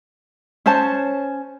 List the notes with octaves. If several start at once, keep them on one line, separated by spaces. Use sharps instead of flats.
C#4 C5 C#5 A5